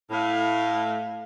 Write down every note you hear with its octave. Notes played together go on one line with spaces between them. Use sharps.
A2 A3 F5